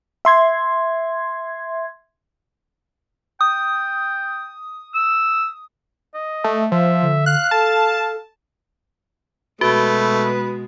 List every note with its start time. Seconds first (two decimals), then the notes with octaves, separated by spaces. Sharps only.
0.25 E5 C6 G#6
3.41 G5 D#6
4.94 E6
6.14 D#5
6.44 A3
6.72 F3 E5
7.02 D3
7.26 F5 F#6
7.51 A4 A5
9.61 B2 G#3 A3 F#4 B4